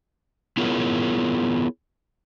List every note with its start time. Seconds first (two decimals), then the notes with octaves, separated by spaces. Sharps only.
0.57 B3 E4 F4 G#4 A#4 C#5